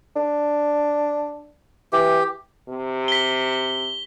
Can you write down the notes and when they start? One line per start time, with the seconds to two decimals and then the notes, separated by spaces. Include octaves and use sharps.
0.16 D4
1.93 E3 G4
2.69 C3
3.08 B6 G7